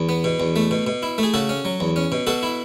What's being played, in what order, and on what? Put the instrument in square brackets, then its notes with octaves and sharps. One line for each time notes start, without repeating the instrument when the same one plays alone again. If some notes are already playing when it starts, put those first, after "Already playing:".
Already playing: [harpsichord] E2
B3
B2
E2
A3
B2
B2
E4
A3 G#4
C#3 F#4 A4
C#4
F#3
E2
C#4
B2
B2 F#4 A4
E4